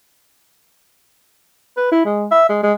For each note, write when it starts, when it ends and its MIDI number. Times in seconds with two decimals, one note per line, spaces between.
1.77 1.91 71
1.92 2.04 64
2.05 2.26 56
2.32 2.48 76
2.49 2.60 56
2.64 2.73 56